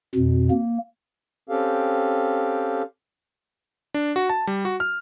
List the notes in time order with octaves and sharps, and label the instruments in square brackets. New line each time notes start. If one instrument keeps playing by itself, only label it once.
[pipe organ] F2 B2
A#3
[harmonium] C4 C#4 G4 A4 F5
[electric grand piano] D4
F#4
A5
G3
F#4
F6